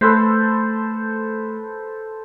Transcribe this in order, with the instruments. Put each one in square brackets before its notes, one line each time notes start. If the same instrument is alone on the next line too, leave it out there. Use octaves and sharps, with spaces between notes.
[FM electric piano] A3 C6 [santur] A4 B4 C5